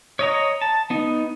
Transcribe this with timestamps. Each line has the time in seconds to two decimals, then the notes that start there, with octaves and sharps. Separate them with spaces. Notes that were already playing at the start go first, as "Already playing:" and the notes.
0.19 C#5 D#5 A#5
0.61 A5
0.90 B3 D#4